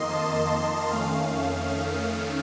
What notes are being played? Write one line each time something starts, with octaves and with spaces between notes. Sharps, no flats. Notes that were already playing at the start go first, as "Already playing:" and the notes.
Already playing: F2 D#3 A#3 D#5 C6
A5
F2 D#3 A3 C#4 F5